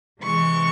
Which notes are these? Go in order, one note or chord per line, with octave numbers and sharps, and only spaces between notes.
C3 E3 G#3 C#6